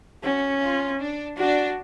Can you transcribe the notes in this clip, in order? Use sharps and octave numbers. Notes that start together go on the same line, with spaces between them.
C#4 F#4
F4
D4
D4 F#4